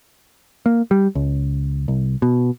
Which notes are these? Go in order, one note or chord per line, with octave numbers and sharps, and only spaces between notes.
A#3
G3
C#2
C2
B2